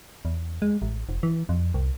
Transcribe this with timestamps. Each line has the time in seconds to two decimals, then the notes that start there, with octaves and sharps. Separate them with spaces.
0.25 E2
0.62 G#3
0.82 A1
1.09 F1
1.23 E3
1.49 F2
1.74 C2